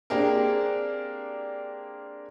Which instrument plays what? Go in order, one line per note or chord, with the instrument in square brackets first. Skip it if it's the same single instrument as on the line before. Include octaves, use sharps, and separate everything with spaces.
[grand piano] A#3 C4 D4 G4 G#4 A#4